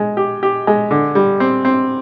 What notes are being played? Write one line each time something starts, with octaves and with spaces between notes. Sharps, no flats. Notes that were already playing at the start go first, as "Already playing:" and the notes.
Already playing: G#3
G4
G4
G#3
D3
G3
C4
C4